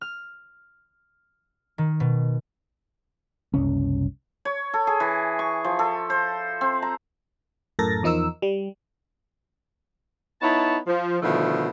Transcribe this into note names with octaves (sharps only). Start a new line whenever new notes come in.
F6
D#3
B2
F#1 C2 C#4
C#5
A4
G#4
E3
C#6
F3
A4
C5
C4
A#5
F#2 A2 A4 A#4 A6 A#6
E2 F3 D#4 A#4 E6
G3
B3 D#4 E4 C#5 A5
F3
B2 D3 D#3 F3 A3 E4